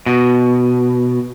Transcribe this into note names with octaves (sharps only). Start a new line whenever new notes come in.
B2